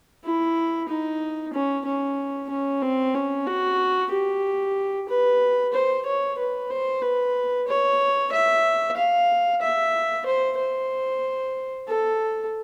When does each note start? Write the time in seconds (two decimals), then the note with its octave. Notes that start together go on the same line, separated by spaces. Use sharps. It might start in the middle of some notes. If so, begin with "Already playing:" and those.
0.24 E4
0.89 D#4
1.53 C#4
1.85 C#4
2.50 C#4
2.82 C4
3.14 C#4
3.46 F#4
4.11 G4
5.08 B4
5.73 C5
6.06 C#5
6.38 B4
6.70 C5
7.02 B4
7.68 C#5
8.32 E5
8.96 F5
9.62 E5
10.26 C5
10.58 C5
11.88 A4